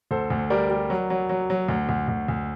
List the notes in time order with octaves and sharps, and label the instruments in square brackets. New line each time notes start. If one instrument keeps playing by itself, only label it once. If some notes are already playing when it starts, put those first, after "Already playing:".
[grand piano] D2 A4 C5
D2
G3 A#4 D5
G3
F#3
F#3
F#3
F#3
D2
D2
D2
D2